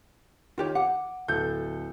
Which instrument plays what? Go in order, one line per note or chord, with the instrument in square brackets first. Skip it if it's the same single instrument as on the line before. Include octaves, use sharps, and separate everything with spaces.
[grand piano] D#3 [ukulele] F4 G4 C#5
[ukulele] F#5 [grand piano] D6
[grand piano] D1 A4 G6